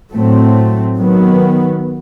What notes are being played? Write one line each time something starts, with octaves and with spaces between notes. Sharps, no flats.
A2 F#3 A3 C4
D#3 F#3 B3